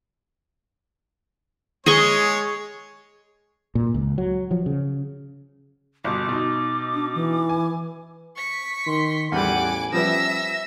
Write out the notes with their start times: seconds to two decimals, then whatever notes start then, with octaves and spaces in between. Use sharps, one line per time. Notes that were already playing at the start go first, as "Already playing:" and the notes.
1.86 G#3 G#4 C#5 D#5 C#6
3.75 A#2
3.94 C#2
4.18 F#3
4.51 F3 F#3
4.66 C#3
6.04 G1 B2 D6
6.29 B2 D#4
6.94 D4
7.15 E3
7.49 G#5
8.36 C#6 B6
8.86 D#3 C6
9.32 A1 E2 G3 F#5 G#5 D6
9.93 F3 G3 B3 C#4 E5 E6 A#6